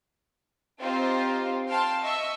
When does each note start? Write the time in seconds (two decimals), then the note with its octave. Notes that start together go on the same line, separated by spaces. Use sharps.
0.79 C4 D#4 F4 G4 C5
1.68 F5 G5 A5 C6
2.02 D#5 E5 C#6 E6